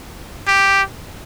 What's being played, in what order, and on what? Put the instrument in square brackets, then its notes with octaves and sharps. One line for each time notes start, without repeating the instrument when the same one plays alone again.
[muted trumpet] G4